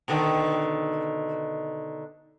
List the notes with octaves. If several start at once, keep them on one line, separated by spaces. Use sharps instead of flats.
B2 D3 D#3